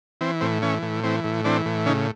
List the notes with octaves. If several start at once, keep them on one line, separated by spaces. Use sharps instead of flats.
E3 C4
A2 C4
E3 C#4
A2
E3 C4
A2
E3 C4 D4
A2
C#3 C#4 D#4